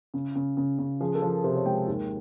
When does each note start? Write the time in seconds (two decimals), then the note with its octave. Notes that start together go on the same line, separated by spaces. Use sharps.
0.14 C#3
0.35 C#3
0.57 C#3
0.79 C#3
1.01 F3 G#4
1.15 A4
1.22 F3
1.30 A#4
1.44 C3 C5
1.55 C#5
1.65 G#3 G5
1.87 D#2